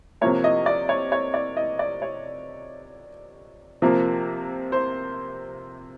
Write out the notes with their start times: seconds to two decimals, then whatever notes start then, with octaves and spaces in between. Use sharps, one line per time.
0.21 C3 F3 A#3 C#5
0.44 D#5
0.66 D5
0.89 C#5
1.12 C#5
1.34 D5
1.57 D#5
1.79 D5
2.02 C#5
3.82 C3 F3 A#3
4.72 C5